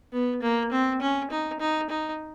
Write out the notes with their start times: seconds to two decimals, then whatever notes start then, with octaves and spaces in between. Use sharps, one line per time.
0.13 B3
0.42 A#3
0.72 C4
1.01 C#4
1.31 D#4
1.60 D#4
1.90 D#4